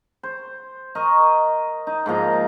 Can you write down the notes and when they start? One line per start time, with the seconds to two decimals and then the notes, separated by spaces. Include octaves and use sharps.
0.23 C5
0.95 A#4 D#5 C#6
1.87 D#4
2.06 G#2 F3 A#3 A#5